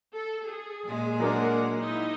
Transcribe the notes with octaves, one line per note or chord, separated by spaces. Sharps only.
A4
G#4
A#2 G#3
F#3 A#3 D4 A#4 F#5
D#4 E4 D#5